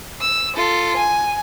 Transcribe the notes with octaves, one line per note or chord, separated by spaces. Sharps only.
E6
F4 A4
G#5